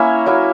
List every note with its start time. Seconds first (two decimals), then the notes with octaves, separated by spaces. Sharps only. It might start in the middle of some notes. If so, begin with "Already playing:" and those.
Already playing: A#3 C#4 E4 C#5
0.26 F#3 A#3 E4